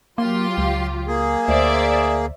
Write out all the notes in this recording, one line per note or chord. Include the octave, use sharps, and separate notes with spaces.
F#3 A#3 F4 G4 C6
C#2
A#3 G#4
D2 C5 D5 E5